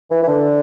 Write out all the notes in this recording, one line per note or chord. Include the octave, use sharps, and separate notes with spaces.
E3
E3
D3